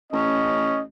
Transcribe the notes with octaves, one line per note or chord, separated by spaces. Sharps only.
A1 C#4 D#5